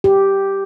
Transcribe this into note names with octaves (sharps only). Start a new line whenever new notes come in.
G4